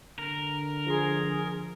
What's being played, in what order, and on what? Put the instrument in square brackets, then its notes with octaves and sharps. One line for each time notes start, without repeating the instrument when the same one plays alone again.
[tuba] D3 [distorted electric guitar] A#4
[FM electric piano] F3 A#5 C6 [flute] G#4